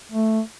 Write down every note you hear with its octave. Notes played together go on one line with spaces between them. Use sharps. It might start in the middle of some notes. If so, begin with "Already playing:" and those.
A3